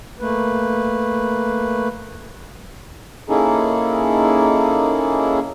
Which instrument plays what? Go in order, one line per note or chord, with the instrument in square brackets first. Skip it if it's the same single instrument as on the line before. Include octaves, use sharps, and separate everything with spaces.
[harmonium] A3 A#3 B4
A#3 C#4 D#4 E4 G#4 A4